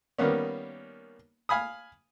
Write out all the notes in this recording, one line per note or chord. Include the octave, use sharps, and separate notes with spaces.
D#3 G3 A#3 B3 C#4
F5 G#5 B5 D#6